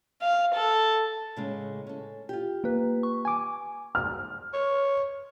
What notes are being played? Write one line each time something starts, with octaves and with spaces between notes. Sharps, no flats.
F5
A4
A2 C#3 G#3
C#4 A4
F4 G4
A#3 B4
C#6
G#5 D6
F6
C#5